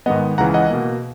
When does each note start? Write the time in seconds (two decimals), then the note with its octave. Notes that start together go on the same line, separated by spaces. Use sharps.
0.06 G#2 D#3 G#3 B3 D#5 F#5
0.38 C#2 C#3 E3 F#5 A#5
0.54 D#5 F#5
0.70 B2 A#3